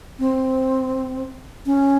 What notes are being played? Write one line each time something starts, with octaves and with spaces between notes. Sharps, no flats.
C4
C#4